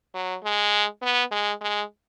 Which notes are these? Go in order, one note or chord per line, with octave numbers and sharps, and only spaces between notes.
F#3
G#3
B3
G#3
G#3